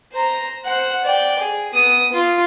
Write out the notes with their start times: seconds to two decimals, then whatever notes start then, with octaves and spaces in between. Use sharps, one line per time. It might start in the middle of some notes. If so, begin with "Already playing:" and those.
0.13 C5 A#5
0.65 C5 F#5
1.04 D5 G5
1.39 G#4
1.74 B3 D#6
2.13 F4